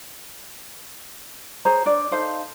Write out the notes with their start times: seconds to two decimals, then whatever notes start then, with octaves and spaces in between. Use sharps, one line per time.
1.65 G#4 C5 C#5 A#5
1.86 D4 C#5 D5
2.11 D#4 A4 C5 F5